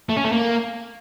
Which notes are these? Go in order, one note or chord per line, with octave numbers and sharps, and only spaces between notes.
A3
C#4
A3
A#3